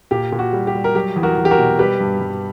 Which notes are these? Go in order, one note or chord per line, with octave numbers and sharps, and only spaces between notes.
A#2 G4
A#2
F#4
G3
G4
G3
A#4
F#3 G4
E2
F#4 A#4
E2
G4
F#4 A#4
B2
G3 G4 B4
G2
G2